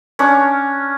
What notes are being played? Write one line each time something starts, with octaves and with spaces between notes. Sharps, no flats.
C#4 D4 C#6